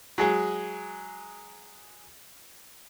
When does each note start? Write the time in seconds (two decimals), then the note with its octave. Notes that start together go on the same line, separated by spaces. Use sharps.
0.18 F#3 G#3 G#4